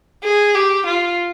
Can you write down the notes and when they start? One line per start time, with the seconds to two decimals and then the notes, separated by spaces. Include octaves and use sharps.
0.24 G#4
0.55 G4
0.86 F4